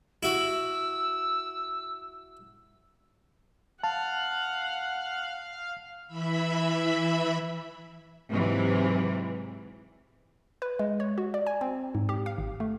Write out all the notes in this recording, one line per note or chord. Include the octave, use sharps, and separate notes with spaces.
E4 F#4 E6
F5 F#5 A5
E3 E5 B5
G#2 C3 E3 F#3
B4
G#3
C#5
F#4
D5
G#5
C4
G#2
G4
F5
G#1
A3